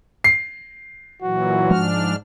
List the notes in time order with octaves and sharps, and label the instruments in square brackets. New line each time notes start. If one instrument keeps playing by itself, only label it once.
[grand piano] C7
[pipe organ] A#2 E3 F#3 [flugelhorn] F#4
[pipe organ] G#2 D4 F6 [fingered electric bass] F3 G#3